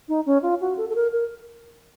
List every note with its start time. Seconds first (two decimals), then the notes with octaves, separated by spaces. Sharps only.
0.09 D#4
0.26 C#4
0.42 F4
0.61 F#4
0.77 A4
0.89 A4
0.96 A#4
1.13 A#4